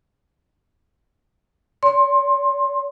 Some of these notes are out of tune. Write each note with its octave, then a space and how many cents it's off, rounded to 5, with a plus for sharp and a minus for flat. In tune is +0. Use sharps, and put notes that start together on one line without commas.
C#5 +45 C6 +20